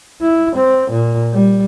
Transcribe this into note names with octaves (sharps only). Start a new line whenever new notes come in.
E4
C4
A#2
G3